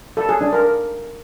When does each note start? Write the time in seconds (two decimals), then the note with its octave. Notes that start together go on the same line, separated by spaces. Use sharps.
0.17 A4
0.29 G#4
0.41 D4
0.53 A#4